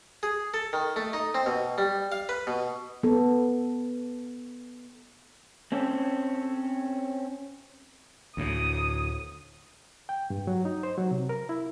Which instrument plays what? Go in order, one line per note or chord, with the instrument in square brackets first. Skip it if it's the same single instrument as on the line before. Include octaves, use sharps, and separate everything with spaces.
[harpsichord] G#4
A4
D#3
A3
D#4
C4
B2
G3
F5
B4
B2
[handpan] B3 A4
[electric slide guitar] C4 C#4 A4
[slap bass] D2 A2 [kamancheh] D#6
[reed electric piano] G5
G2
F#3
D#4
C5
F#3
C3
A#4
E4